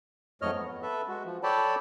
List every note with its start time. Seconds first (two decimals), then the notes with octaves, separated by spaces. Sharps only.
0.42 F2 G#2 A3 C#5 D#5 F6
0.55 B3
0.82 A4 B4 E5
1.08 G#3 F#4
1.25 F3
1.43 A4 C#5 D5 G5 A5 B5